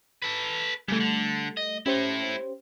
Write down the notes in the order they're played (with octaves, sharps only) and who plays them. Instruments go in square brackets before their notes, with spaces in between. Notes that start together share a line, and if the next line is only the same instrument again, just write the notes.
[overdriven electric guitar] A4 B4
[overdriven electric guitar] C#3 E3 [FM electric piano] G3 A3
[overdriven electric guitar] D3
D#5
[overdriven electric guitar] A3 E4 [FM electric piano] C#4 G4 C5